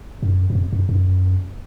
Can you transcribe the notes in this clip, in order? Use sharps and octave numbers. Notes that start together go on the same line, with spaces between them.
F#2
F#2
F2
F#2
F#2